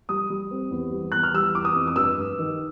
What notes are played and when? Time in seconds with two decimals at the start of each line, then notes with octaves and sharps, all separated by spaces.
0.09 G3 D#6
0.30 G3
0.51 C4
0.71 E2
0.92 G3
1.12 E2 F#6
1.23 F6
1.34 G3 E6
1.55 E3 D6
1.65 D#6
1.76 F2
1.87 D#6
1.96 G2 E6
2.18 G2
2.39 D#3